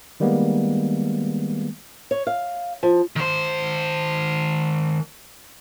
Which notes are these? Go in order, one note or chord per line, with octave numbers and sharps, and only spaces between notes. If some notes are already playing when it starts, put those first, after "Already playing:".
D#3 G3 G#3 A#3 B3
C#5
F5
F3
D#3 C5